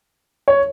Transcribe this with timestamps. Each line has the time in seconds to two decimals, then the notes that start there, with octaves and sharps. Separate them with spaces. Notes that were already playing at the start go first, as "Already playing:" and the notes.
0.48 C#5